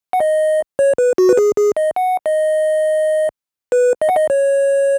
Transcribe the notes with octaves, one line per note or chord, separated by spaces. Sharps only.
F#5
D#5
C#5
B4
F#4
B4
G#4
G#4
D#5
F#5
D#5
B4
D#5
F#5
D#5
C#5